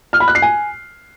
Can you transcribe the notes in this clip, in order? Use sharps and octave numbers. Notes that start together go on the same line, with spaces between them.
F6
B5
F#6
C7
G#5